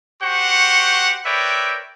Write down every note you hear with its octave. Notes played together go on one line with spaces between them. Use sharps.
F#4 G4 C5 F#5 C#6
A#4 B4 C#5 D5 E5 G5